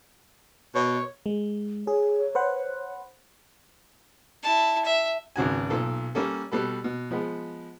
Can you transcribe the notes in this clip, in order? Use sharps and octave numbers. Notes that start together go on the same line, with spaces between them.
B2 C#5
G#3
G#4 C#5
B4 C5 F#5
E4 A5
E5
G#1 C#2 F#4 G#5
B1 A#2 A4
G3 A#3 C#4 A4
B2 G3 A4 B4
B2
F3 G#3 B3